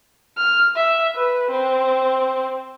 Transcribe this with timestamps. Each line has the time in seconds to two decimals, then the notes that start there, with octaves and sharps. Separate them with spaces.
0.37 F6
0.76 E5
1.15 B4
1.50 C4